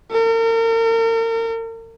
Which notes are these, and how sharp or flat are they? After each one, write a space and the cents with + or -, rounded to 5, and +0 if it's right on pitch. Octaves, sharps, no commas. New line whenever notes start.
A#4 -40